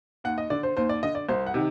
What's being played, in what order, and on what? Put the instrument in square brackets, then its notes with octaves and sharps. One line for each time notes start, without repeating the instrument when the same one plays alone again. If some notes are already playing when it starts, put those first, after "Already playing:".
[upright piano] D#2 F#5
D#5
D3 D5
C5
D#2 C5
D5
D3 D#5
D5
C2 C5
F#5
C3 D#3